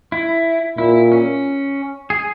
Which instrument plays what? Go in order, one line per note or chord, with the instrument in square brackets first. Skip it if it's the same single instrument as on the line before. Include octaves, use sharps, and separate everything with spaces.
[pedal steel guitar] E4
[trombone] A#2 [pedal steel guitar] E4
[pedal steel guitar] C#4
G#4